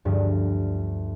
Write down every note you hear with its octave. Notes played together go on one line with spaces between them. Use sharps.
D2 G2 F3